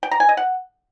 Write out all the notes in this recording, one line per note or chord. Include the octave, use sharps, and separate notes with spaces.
G5
A#5
G#5
D#5
F#5